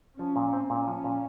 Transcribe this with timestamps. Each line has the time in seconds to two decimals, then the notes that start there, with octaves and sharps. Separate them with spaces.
0.19 F3 C#4
0.36 A#2
0.53 C4
0.70 A#2 C#4
0.87 F3
1.04 A#2